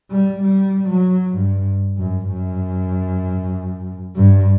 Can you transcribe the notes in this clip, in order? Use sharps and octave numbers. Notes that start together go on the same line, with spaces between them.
G3
G3
F#3
G2
F#2
F#2
G2